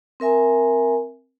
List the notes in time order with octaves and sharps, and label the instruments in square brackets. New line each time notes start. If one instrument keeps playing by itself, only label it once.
[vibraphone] C4 A#4 E5 G#5 A#5